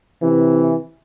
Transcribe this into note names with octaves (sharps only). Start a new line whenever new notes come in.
C3 E3